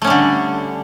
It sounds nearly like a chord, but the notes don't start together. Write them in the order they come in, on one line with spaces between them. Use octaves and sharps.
A3 C#4 G3 D3